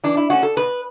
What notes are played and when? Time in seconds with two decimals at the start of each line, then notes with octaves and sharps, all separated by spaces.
0.04 E3 D4
0.17 E4
0.30 A3 C#4 F#4
0.43 A4
0.57 B2 B4